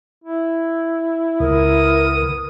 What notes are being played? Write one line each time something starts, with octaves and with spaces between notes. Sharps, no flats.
E4
C#2 B3 A#4 D#6